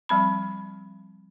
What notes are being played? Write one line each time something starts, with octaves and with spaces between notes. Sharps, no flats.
F3 G3 C4 B5